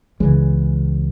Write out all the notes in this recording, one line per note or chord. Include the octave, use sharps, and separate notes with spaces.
C#2 C#3 E3 G#3